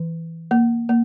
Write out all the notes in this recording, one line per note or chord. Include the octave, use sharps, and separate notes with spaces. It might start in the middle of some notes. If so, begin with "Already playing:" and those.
Already playing: E3
A#3
A#3